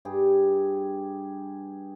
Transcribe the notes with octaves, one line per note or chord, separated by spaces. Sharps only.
G2 G4 G#4